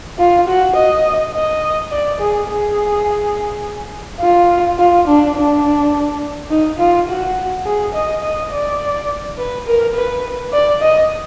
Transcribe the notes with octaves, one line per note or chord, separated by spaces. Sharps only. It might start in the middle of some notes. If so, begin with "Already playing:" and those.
F4
F#4
D#5
D#5
D5
G#4
G#4
F4
F4
D4
D4
D#4
F4
F#4
G#4
D#5
D#5
D5
B4
A#4
B4
D5
D#5